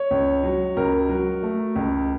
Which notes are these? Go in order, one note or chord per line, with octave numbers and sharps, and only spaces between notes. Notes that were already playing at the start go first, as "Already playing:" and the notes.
Already playing: C#5
C#2
F#3
C#2 A#4
F#3
A3
C#2